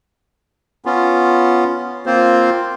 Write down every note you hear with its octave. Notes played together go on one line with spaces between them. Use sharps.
B3 C#4 F4
A#3 C4 F4 C5